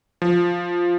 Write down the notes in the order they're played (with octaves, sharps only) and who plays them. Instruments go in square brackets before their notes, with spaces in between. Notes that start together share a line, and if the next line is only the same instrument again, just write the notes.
[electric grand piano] F3